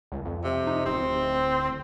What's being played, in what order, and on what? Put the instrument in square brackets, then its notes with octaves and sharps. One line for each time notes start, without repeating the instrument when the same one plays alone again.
[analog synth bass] C#2
F2
[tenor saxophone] C3
[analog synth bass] D#4
[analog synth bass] D1 [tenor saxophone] C4